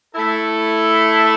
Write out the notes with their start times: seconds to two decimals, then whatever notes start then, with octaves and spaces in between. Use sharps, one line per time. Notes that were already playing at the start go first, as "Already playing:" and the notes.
0.15 A3 E4 A4